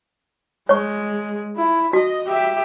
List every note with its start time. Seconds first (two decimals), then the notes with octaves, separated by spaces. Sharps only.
0.69 G#3 C#5 C#6
1.56 E4
1.93 F#4 D#5
2.28 G4 E5